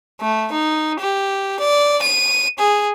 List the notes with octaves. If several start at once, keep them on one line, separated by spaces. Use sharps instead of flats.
A3
D#4
G4
D5
D#7
G#4